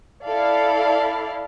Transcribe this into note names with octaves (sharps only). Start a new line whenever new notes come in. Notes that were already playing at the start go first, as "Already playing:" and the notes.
E4 A4 D5 F5